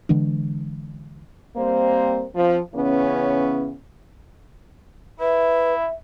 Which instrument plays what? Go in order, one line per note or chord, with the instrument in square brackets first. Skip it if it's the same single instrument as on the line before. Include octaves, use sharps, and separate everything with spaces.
[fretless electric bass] D3 E3 G#3 D4
[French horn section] G3 A#3 C4 A#4 C5
F3 C4
C#3 E3 B3 C#4
[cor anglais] E4 [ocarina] B4 [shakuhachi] E5